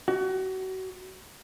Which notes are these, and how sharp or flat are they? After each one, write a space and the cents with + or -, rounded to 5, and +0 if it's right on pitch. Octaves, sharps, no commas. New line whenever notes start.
F#4 +30